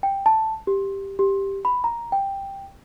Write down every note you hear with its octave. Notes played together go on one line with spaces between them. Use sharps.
G5
A5
G4
G4
B5
A#5
G5